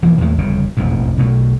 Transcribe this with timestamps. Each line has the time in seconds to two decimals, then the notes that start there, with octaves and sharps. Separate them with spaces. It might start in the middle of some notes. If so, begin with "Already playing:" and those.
0.02 E1 E3 F3 A#3
0.21 D#2 A2 G#3 A3
0.38 G1 F2 C#3
0.77 E1 A1 F2 G#2
1.18 B1 B2 F3 A3